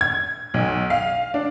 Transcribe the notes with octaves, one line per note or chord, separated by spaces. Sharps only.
G#6
B1
F5
D4